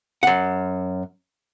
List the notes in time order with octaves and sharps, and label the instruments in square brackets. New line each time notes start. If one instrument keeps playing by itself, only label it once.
[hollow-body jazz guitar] F#2 F#5